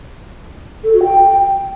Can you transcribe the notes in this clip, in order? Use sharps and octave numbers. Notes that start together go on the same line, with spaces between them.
A4
F#4
G5